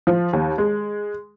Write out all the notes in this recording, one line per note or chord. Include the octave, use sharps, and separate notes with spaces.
F3
D#2
G#3